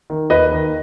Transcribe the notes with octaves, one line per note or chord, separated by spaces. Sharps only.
D#3
D#2 B4 D#5
D#3